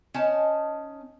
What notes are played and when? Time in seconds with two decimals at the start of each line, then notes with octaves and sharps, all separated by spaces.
0.14 C#4 D#4 A5